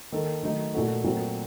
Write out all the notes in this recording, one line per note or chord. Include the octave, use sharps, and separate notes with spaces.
D#3 A#3 D#4 A4
D#3 F#3 A3 D#4
A#2 A3 D#4 F#4 A4
A#2 F#3 A3 C4 F#4